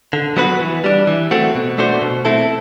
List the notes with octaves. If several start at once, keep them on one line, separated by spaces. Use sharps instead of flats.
D3
F#3 B3 F#4 B4
E3
G3 D4
E3
A3 C4 F#4
B2
A3 D4 F#4 C5
B2
A3 C4 E4 A4